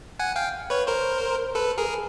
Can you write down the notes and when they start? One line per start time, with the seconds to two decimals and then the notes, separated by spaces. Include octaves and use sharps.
0.19 F#5 G#5
0.36 F5 G5
0.70 B4 C#5
0.87 A#4 C5
1.55 A4 B4
1.78 G#4 A#4